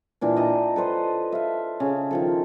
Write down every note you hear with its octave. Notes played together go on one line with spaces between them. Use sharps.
A#2 E3 D4 G5
D#5 A5 A#5
A4 B4 C5 D#5
E5 F5
C#3
D#3 F3 A4